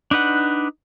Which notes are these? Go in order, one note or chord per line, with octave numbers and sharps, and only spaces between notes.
D4 D#4 B4 F#5